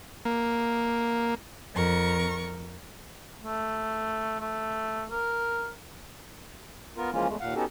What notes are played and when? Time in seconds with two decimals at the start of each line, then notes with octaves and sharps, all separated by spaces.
0.25 A#3
1.75 F2 A#4 C#6
3.42 A3
4.40 A3
5.11 A#4
6.97 B3 F4 A#4
7.13 E3 F3 G#3 A#3 C#4 F4
7.28 E2 G#3 A3
7.40 D#2 A#2 F5 F#5
7.56 B3 C#4 D#4 F#4 G4 A4